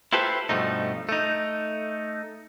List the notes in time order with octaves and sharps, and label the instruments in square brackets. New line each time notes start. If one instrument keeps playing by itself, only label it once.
[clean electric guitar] E4 F4 G4 A4 B4 C5
G2 B2 F3 A3 D#4
A3 D#4